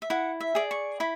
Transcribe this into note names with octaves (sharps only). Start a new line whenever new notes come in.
E5
E4 F#5
E5
G#4 D5
C#6
E4 B5